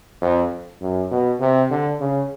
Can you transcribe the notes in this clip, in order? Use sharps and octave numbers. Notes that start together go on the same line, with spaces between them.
F2
F#2
B2
C3
D3
C#3